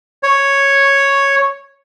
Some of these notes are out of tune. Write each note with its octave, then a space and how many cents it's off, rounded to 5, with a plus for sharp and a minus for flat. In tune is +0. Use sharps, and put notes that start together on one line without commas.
C#5 -5